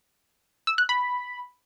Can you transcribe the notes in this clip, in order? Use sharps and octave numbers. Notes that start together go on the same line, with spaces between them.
E6
F#6
B5